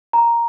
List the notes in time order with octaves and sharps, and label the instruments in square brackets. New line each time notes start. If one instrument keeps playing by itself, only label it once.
[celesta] A#5